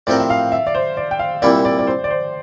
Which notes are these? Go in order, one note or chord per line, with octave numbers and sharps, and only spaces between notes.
A2 F3 C4 G4 A#4 D5
E5
F5
E5
D5
C5
D5
G5
F5
C2 A#2 G3 A#3 E4 D5
D5
D5
C5
D5
C5